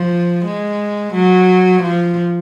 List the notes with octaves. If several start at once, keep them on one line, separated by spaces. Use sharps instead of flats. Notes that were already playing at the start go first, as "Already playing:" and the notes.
Already playing: F3
G#3
F#3
F3